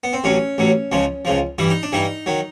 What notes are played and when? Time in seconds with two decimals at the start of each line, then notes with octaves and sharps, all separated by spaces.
0.04 B3
0.13 C4
0.24 A1 A2 F#3 C#4
0.58 A1 A2 F#3
0.92 C#2 C#3 F3
1.25 C#2 C#3 F3
1.58 G2 E3 G3 E4
1.70 D#4
1.83 D4
1.92 G2 E3 G3 D#4
2.26 D#3 F#3